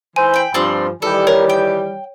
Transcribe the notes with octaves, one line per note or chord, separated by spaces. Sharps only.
E3 E4 C5 G#5
G5 B5
G2 F3 C4 D4 C6
D#3 E3 G3 A4
A#4 C#5
G5